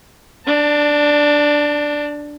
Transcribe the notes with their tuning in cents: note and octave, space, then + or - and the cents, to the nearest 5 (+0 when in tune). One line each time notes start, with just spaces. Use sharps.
D4 +0 A5 +30